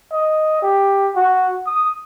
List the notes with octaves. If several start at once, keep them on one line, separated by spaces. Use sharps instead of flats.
D#5
G4
F#4
D#6